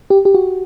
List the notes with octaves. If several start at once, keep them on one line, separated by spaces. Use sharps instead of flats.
G4
G4
F#4